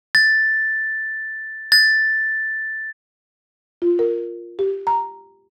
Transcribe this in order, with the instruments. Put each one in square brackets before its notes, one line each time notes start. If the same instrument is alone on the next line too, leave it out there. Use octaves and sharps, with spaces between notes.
[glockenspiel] A6
A6
[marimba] F4
A#4
G4
A#5